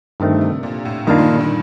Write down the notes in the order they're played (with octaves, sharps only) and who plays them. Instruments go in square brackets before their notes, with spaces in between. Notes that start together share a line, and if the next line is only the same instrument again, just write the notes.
[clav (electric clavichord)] G2 D#3 A3 C4 [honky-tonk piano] D3
[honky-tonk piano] C3
A#2
A2
[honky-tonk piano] G2 [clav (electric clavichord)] D#3 A#3 D4 F4
[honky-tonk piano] A#2
D3
D#3